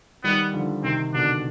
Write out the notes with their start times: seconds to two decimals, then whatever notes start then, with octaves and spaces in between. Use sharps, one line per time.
0.24 D#3 G3 B3
0.53 D3 F3
0.84 C3 D#3 C4
1.14 B2 D3 D4